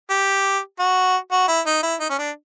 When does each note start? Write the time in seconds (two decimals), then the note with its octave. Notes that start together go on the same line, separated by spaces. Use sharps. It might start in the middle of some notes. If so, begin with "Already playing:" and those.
0.10 G4
0.79 F#4
1.31 F#4
1.48 E4
1.66 D#4
1.83 E4
2.00 D#4
2.10 C#4
2.18 D4